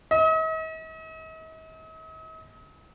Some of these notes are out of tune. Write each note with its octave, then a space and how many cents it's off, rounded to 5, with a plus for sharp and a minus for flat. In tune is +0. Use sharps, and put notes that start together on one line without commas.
D#5 +45